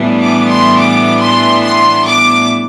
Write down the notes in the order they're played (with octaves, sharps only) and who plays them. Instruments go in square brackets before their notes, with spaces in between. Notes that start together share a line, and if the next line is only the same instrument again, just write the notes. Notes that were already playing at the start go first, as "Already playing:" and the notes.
Already playing: [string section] A2 E3 G3 B3 D4
D6
C6
D6
C6
C6
D6